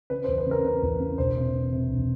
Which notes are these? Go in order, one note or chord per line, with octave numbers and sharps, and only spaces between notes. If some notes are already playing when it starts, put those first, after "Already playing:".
C#3 B4
C5
E2
B4
C#3 A#4
C#3 B4
E2
C#3
E1 C5
C3
C3
C3
E1